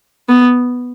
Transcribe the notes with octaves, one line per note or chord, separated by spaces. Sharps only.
B3